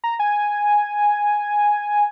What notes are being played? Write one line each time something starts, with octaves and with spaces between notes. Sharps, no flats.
A#5
G#5